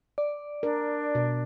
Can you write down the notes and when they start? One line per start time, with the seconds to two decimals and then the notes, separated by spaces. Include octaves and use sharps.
0.18 D5
0.63 D4 A#4
1.15 B2